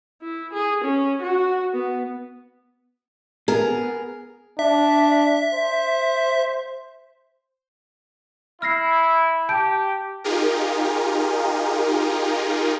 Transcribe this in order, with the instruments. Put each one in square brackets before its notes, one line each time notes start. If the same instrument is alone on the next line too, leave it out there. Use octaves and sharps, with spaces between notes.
[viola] E4
G#4
C#4
F#4
B3
[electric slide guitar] B3 [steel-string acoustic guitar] G#4 A#4
[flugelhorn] D4 [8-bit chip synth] E5
[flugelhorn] C5
[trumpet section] E4 [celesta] F6 A#6 C7
[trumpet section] G4 [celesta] A5 G6 D7
[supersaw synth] D#4 F4 G4 G#4 A#4